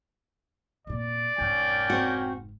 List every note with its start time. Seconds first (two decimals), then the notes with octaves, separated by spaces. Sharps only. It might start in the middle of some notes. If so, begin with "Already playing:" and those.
0.87 F1 A#2 D5
1.38 F1 G#2 A#3 C#4 G5
1.90 C4 F#4